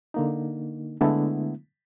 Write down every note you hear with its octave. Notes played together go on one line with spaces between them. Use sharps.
D3 A#3 D#4
D3 G#3 A3 B3 D4 E4